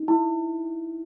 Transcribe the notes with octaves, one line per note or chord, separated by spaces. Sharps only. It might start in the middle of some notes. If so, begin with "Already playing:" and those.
Already playing: D#4
E4